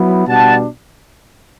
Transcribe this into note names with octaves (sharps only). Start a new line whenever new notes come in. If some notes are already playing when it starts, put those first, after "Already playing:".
Already playing: F#3 B3 E4
B2 G3 D4 F#5 A5